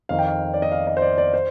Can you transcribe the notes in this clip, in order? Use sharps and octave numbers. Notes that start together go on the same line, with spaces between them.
F2 D#3 F5
G5
F5
D5
D#5
F5
D#5
C5
D5
D5
C5